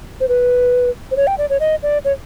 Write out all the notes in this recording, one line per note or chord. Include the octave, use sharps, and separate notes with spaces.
C5
B4
C5
C#5
G5
D5
C#5
D#5
D5
C#5